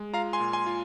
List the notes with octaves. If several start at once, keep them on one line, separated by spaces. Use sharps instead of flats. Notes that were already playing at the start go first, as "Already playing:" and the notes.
Already playing: G#3
F4 F5 A#5
G#5 C6
A#2
G#5 C6
F4